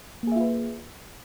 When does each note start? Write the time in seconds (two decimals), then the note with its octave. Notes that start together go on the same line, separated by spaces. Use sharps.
0.23 A#3
0.27 G#4
0.32 E5
0.36 F4
0.40 B4